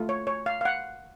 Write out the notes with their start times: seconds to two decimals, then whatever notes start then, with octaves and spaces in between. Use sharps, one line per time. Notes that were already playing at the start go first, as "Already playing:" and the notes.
Already playing: A3 F4
0.09 C#5
0.27 C#5
0.46 F5
0.61 F5
0.65 F#5